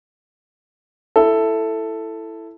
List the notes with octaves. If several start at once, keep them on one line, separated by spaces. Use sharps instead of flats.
E4 A4